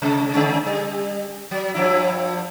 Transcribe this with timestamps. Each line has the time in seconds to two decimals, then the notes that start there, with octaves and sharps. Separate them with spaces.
0.02 C3 G#3
0.34 C#3 G#3 C#4
0.66 G3
1.51 F#3
1.74 G2 F3 E4